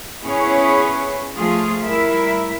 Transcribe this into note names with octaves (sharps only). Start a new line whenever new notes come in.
B3 C#4 E4 G#4 B4 C#5
F3 A3 F4 G#4
G3 E4 A#4 E5